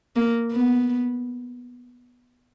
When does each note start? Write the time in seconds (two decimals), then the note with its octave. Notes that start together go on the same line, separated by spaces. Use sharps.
0.16 A#3
0.52 B3